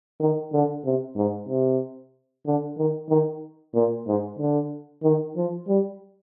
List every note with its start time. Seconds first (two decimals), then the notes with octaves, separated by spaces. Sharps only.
0.20 D#3
0.53 D3
0.85 C3
1.16 G#2
1.49 C3
2.46 D3
2.78 D#3
3.10 D#3
3.74 A#2
4.07 G#2
4.39 D3
5.03 D#3
5.36 F3
5.68 G3